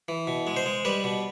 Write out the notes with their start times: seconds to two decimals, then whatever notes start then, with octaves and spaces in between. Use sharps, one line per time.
0.08 E3
0.27 B2
0.47 G#3
0.57 C5
0.66 G#3
0.85 G3 B4
1.04 B2